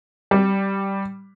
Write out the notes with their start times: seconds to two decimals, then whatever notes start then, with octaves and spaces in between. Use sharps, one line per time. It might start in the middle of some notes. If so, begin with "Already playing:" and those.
0.31 G3